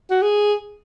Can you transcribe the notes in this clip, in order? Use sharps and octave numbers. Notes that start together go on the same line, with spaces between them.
F#4
G#4